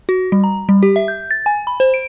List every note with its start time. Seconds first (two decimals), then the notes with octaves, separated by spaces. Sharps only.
0.09 F#4
0.32 G3
0.44 A#5
0.69 G3
0.83 G4
0.96 E5
1.08 G6
1.31 A6
1.46 G#5
1.67 B5
1.80 C5
1.94 D7